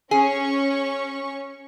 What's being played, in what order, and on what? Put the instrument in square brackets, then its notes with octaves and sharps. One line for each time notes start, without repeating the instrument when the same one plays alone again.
[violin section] C#4 C#6 [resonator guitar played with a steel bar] G#4